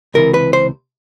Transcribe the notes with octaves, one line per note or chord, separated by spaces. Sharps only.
C#2 C3 E3 A#4
B4
C5